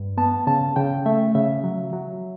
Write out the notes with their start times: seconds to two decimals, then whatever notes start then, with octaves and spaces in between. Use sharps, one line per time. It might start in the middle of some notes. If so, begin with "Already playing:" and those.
Already playing: G2
0.17 B3 A5
0.47 C#3 A5
0.76 C#3 G5
1.06 A3 E5
1.35 C#3 E5
1.64 F#3
1.93 F#3